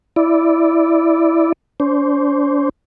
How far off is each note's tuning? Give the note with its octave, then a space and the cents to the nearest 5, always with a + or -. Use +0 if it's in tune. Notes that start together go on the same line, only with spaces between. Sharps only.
E4 +0 D5 +0
D4 -45 C5 +0